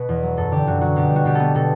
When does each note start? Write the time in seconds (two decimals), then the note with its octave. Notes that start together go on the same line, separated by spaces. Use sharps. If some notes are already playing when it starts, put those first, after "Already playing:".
Already playing: B2 B4
0.09 E2
0.23 F#3
0.37 F#2 A4
0.52 D3 G4
0.67 F#2 F#4
0.81 F#3 F#4
0.96 B2 G4
1.10 G3
1.16 F#4
1.25 B2 G4
1.35 B3 A4
1.55 B2 A4